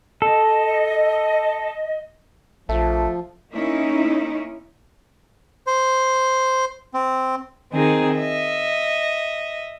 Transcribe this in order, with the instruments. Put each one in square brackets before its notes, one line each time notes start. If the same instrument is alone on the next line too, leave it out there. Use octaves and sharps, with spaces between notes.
[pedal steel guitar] A4 [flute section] D#5
[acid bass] A#1 [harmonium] F3 [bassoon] A3
[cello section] A#3 C#4 D#4 E4
[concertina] C5
C4
[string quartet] D#3 C4 D#4 G#4
D#5 E5